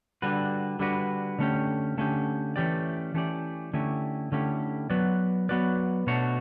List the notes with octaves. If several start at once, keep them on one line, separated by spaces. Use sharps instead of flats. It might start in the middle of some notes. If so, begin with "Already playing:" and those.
D3 G3 D4 F#4 B4
D3 G3 D4 F#4 B4
D3 A3 C#4 G4
D3 A3 C#4 G4
E3 A3 C#4 G4 D5
E3 A3 C#4 G4 D5
D3 A3 C#4 E4 G4
D3 A3 C#4 E4 G4
F#3 B3 F#4 B4 D5
F#3 B3 F#4 B4 D5
B2 A3 D4 F#4 C#5